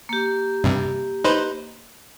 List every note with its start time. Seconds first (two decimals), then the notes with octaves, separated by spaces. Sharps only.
0.09 A#3 G4
0.64 G2 C3
1.24 D#4 B4 C5